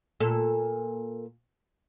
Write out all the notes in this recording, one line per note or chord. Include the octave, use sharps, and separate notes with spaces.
A#2 A4